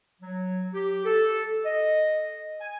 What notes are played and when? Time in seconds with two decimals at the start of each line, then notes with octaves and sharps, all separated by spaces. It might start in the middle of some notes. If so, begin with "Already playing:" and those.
0.21 F#3
0.73 G4
1.04 A4
1.64 D#5
2.61 G#5